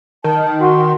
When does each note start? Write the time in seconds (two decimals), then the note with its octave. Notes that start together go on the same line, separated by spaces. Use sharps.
0.24 D#3 A5
0.61 F#4 C6